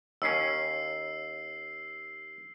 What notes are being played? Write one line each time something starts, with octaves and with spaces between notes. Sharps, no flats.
D#2 C#4 E6 C7